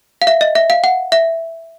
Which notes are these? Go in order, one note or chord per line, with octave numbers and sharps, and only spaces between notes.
F5
E5
D#5
E5
F5
F#5
E5